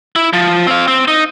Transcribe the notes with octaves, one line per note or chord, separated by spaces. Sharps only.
E4
F3
C4 F5
C4
D#4